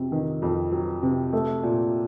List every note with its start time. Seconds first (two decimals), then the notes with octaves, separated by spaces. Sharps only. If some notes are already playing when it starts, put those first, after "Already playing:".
Already playing: F2 C3 F#3
0.12 D#3
0.42 F2
0.71 F#3
1.03 C3
1.33 A3
1.63 A#2